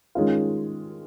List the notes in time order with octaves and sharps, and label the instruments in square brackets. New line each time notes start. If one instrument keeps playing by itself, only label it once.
[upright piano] D#3 G#3 C#4 F4